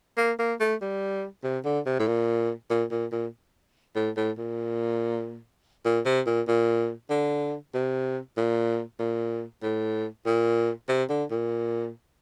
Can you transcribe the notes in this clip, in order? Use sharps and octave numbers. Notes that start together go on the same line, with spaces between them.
A#3
A#3
A3
G3
C3
D3
C3
A2
A#2
A#2
A#2
A#2
A2
A2
A#2
A#2
C3
A#2
A#2
D3
C3
A#2
A#2
A2
A#2
C3
D3
A#2